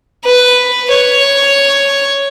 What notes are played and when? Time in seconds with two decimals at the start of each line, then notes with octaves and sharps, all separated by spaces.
0.24 B4
0.90 C#5